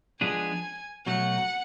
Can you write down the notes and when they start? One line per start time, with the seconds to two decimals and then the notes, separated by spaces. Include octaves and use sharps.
0.21 F3 G#3 B3 D4 G#4 G#5
1.06 B2 F#3 A3 F#5